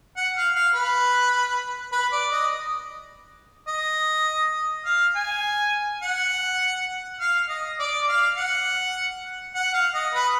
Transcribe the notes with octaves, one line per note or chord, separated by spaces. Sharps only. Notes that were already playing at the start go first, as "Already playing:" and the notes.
F#5
F5
F5
B4
B4
D5
D#5
D#5
F5
G#5
F#5
F5
D#5
D5
F5
F#5
F#5
F5
D#5
B4